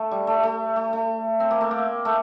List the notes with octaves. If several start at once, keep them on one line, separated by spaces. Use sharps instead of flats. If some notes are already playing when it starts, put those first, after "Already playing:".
Already playing: A3
G3
A3
A3
A3
A3
C4
A#3
A3
A#3
A3